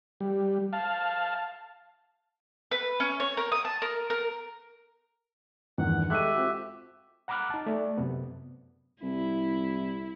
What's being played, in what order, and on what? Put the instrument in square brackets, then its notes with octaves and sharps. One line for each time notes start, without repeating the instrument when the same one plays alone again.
[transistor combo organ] G3
F5 A5
[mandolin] B4
C#4
C#5
A#4
D#6
A5
A#4
A#4
[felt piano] E2 [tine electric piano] G2 D#3 E3 [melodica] F#5
[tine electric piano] G#3 A4 C#6 [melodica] G4 E5 [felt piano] F#6 D#7
[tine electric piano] C4 F4 F#4
[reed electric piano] F#5 A#5 B5 D6 F6 F#6
D#4 A5
A3 D5
F#2 C3 B3
[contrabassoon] C2 [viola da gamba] E4